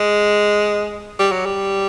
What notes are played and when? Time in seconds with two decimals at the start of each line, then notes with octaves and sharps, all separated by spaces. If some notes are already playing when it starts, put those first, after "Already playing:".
Already playing: G#3
1.19 G3
1.32 F#3
1.46 G3